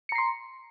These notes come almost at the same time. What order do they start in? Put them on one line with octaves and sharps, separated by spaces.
C#7 A#5 C7 C6